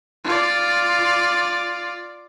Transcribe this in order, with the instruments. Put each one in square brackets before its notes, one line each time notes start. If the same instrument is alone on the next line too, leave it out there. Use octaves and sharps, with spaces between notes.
[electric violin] F4 D5